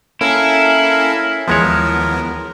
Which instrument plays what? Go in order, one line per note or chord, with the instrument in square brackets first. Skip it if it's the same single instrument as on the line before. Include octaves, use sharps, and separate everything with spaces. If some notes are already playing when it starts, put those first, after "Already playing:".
[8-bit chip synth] A#3 C#4 A4 [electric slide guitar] E4 [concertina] A#4 F5 G#5
[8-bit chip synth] D#2 E3 B3 [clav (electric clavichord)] F3 G#3 C#5 [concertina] A#4